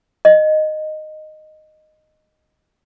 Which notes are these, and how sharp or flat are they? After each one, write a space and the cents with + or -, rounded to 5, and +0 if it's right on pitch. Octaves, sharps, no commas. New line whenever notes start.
D#5 -10